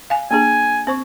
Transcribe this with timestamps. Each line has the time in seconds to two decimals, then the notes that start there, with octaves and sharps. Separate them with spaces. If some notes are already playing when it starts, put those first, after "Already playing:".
0.10 F5 G#5
0.31 A#3 D4 G#4 G#5
0.87 C4 C5 C#6